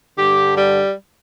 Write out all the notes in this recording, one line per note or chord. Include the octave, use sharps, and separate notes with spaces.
G2 D3 G4
G3